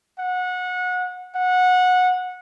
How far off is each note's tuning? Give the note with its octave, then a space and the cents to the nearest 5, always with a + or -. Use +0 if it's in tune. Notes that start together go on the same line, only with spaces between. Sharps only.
F#5 -25
F#5 -20